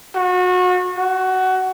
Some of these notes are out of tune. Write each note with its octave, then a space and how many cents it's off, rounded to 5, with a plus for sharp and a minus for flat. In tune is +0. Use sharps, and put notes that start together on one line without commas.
F#4 -30
F#4 +15